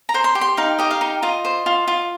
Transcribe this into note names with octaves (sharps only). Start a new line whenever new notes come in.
A#5
C5
C6
G4
C6
D#4 F5
G4 D#5
F5
D#4
F4 D#5
C5
F4
F4